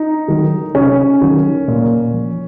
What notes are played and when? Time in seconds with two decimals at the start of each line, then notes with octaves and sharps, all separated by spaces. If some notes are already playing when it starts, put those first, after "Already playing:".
Already playing: D#4
0.28 D#3 F#3
0.74 C3 C#4
1.21 D#3 F#3
1.68 A#2
2.13 F3